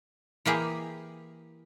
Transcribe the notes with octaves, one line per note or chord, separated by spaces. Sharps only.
E3 A#3 G4 G#4